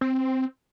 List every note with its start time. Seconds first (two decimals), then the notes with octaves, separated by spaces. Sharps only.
0.01 C4